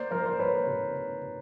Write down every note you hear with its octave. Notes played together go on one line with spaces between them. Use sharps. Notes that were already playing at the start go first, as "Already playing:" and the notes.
Already playing: A#3 C5 D5
F3 A#4 C5
A#4 C5
A#3 B4 C#5
C3
C3
C3